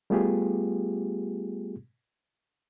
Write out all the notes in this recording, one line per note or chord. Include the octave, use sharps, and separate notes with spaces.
G3 A3 B3 F4 G4 G#4